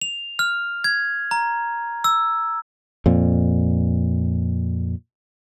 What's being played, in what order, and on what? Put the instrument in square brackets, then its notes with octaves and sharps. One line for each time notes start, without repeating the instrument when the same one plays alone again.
[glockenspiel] F7
F6
G#6
A#5
E6
[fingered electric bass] F2 A#2